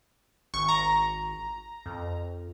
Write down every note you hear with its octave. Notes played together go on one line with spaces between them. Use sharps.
G#1 C#6
A#5
F2